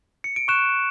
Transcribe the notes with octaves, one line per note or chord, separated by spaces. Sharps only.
C#7
D7
C#6 F#6 E7